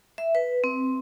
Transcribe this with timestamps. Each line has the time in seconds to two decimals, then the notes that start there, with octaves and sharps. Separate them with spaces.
0.18 E5
0.35 B4
0.64 C4